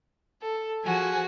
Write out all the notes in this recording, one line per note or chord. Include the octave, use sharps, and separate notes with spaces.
A4
F3 F#4 G#4 G#5